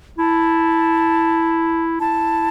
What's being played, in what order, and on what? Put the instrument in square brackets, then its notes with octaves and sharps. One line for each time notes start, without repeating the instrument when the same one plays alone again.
[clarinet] E4 [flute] A5
[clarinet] E4 [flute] A5